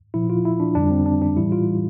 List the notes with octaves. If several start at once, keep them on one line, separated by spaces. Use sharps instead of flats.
A#2 F3 E4
F4
E4
D4
F2 D3 G3 D4
C4
D4
D4
A2 E3 G3 E4
F4